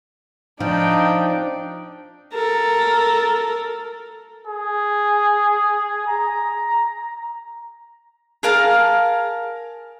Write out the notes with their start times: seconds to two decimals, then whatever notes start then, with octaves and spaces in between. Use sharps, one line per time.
0.60 F3 D4 D#4 G5
2.34 A4 A#4
4.47 G#4
6.08 A#5
8.43 G#4 A#4 F5 A5